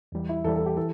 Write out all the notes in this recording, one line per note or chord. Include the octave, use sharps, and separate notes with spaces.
E2 E3 G3
E4
E2 E3 G3 A4
A4
G4
E3 A4